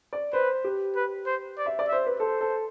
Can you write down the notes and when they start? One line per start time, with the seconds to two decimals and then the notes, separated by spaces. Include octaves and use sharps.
0.13 D5
0.33 B4 C5
0.64 G4
0.96 B4
1.27 C5
1.58 D5
1.66 E5
1.79 D5
1.88 C5 E5
2.07 B4
2.20 A4 C5
2.41 A4